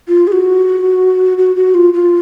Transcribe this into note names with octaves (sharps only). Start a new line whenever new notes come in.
F4
G#4
F#4
F#4
F#4
F4
F4